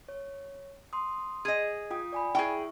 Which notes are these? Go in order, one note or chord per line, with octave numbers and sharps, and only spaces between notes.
C#5
C6 D#6
G#4 D#5
F4 G5 D#6
D5 G#5 B5
E4 G#4 E5 G5 C#6